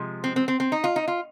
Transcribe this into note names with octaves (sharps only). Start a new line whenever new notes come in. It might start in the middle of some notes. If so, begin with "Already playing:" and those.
Already playing: C3 F3 G#3
C4
C4
C4
C4
D#4
F4
D#4
F4